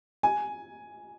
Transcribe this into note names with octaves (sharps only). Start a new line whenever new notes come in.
G#5